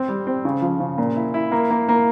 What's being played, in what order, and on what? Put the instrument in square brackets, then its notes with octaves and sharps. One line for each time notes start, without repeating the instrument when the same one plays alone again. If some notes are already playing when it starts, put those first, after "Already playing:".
Already playing: [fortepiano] C4
G3
C4
C#3
F3
C#3
A#2
E4
E4
A#3
A#3
A#3